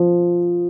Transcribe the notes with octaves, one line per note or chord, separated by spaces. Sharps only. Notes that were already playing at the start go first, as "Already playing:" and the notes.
Already playing: F3